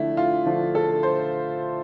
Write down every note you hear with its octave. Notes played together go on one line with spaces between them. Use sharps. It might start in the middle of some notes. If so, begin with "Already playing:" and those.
Already playing: D3 F3 A3 D4 E4
F4
D3 F3 A3 D4
A4
C5